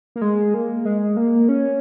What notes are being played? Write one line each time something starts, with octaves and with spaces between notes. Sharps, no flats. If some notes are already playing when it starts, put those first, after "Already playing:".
A#3
G#3
A#3
G#3
A#3
C#4